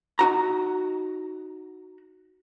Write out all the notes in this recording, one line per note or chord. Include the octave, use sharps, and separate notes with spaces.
D#4 F#4 A#5